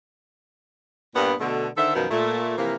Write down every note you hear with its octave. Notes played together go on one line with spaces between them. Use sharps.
G2 A#2 B3
B2 D3 A3
D3 D#3 A4 C5 E5
F#2 B2 D#3 F3 B3 D#4
A#2 A3
C3 E3 F3 A#3